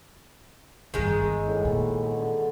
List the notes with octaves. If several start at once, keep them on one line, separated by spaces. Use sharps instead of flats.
G2 A#2 D#3 G#3
G1 G2 G#4 E5
A2 D3 E3
A#2
B2 F#5
D3